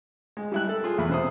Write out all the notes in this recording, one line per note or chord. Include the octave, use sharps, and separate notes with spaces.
G#3
G3 E4 F#6
A4
F4 G#4
E2 B5
C3 C5 D#6